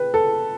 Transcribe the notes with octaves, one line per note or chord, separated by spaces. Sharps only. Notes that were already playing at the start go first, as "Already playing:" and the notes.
Already playing: B4 G5
A4